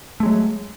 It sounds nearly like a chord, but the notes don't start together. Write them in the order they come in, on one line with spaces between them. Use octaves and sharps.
A3 G#3 F#3